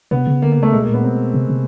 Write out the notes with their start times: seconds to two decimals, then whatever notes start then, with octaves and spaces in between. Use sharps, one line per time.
0.11 C3 B3
0.27 C#3
0.42 D3 A#3
0.52 A#3
0.57 C#3
0.63 A3
0.73 B2 G#3
0.83 A#3
0.89 A#2 B3
1.04 B2 C4
1.34 C3
1.50 C3